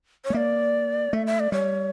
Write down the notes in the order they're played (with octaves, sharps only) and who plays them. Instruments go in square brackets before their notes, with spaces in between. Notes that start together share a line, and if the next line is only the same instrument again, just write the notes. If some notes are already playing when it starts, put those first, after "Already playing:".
[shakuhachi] C#5
[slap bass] A3
[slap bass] A#3 [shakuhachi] D5 E5
[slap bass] A3 [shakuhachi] E5
[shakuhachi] E5
D5
[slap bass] G3 [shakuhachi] C#5